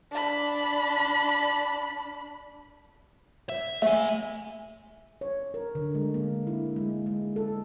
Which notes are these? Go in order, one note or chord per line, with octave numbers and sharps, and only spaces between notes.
D4 B5
E5
A3 E5 G#5
C#5
A#4
D3
G#3
A#3
E4
G#3
G#3
A4